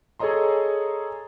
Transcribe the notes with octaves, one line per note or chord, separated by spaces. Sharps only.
G#4 A4 C#5 D#5 A#5 C6